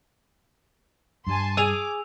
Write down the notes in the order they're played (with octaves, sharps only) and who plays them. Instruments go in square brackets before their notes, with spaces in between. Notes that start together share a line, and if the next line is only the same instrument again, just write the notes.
[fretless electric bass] G2 G3 [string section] G#5 A5 C6
[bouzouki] G#4 G#5 [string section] D6 [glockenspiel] E6 F7